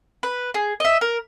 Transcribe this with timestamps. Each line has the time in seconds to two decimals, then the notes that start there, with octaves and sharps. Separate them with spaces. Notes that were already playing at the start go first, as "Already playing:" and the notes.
0.23 B4
0.54 G#4
0.80 D#5 E5
1.01 A#4